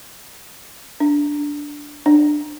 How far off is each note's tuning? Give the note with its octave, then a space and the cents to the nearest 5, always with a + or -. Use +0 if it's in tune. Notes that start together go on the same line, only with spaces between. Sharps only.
D4 -5
D4 +20